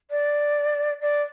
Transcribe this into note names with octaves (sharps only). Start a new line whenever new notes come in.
D5
D5